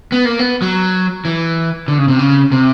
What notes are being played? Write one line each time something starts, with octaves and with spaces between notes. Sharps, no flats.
B3
A#3
B3
F#3
E3
D3
C#3
C3
C#3
C3